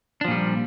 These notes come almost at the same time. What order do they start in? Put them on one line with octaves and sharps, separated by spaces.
D4 F3 A#2 G3